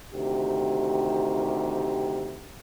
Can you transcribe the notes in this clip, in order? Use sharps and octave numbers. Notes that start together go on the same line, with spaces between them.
D2 C3 D#3 G4